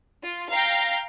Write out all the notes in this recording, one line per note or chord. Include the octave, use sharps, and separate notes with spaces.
F4
F5 G5 A#5 A#6